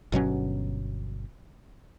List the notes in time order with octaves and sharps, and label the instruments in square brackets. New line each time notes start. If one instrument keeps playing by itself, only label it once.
[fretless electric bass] G1 B2 F#3 C#4